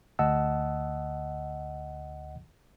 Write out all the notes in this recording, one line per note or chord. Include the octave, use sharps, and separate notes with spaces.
D2 D#5 F#5 A5 E6